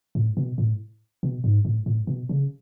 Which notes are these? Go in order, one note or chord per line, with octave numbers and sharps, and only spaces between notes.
A2
B2
A2
B2
G#2
A2
A2
B2
C#3